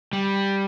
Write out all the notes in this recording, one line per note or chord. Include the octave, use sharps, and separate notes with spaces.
G3